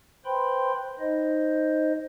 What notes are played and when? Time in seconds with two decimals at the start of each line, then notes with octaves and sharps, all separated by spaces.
0.25 B4 C5 G5 B5 C6
0.99 D#4 C5 D#5